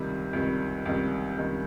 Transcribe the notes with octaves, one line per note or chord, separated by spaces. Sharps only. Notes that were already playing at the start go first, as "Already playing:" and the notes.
Already playing: C#2 C3 D#3 G3
C#2 C3 D#3 G3
C#2 C3 D#3 G3
C#2 C3 D#3 G3